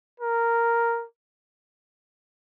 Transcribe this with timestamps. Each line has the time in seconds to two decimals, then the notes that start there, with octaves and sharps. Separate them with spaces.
0.20 A#4